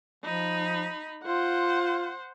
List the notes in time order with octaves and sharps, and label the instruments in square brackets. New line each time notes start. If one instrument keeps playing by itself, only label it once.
[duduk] F3 [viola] D#4 B5
[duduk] F4 [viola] C5 F#5